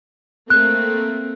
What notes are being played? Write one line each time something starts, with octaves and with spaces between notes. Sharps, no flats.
A3 A#3 C4 F#6